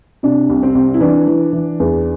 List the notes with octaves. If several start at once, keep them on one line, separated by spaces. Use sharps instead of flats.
C3 D4
C2
C4
C2
E4
E3 D4
E3
E3
E2